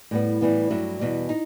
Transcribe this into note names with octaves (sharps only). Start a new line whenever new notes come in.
A2 G3 B3
A2 E3 G3 B3
G2 F#3 A3 E4
E2 B2 G3
D#4